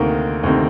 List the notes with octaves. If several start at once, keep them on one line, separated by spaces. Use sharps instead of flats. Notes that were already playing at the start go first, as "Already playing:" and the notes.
Already playing: D2 C3 D#3 A#3 A#4
D2 C3 D#3